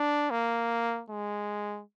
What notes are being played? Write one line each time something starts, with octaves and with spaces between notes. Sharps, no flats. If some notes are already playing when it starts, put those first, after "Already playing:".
Already playing: D4
A#3
G#3